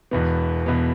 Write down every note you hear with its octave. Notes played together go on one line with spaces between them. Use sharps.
E1 E2 B2 B3
E2 B2 B3